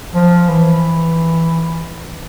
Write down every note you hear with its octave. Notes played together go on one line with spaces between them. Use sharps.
F3
E3